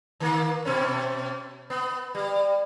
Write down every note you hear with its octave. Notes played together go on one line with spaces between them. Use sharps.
D#3 A#3
B2 C4 C#4
B3
G3